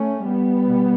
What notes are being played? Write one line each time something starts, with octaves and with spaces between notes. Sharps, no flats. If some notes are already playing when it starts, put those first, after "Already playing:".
Already playing: A3 C#4
G3 B3
B2